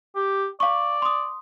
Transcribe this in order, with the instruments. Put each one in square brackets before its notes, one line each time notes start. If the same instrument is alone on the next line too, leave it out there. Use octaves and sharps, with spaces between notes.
[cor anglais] G4
[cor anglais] D5 [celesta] F5 C#6
[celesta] C6 D#6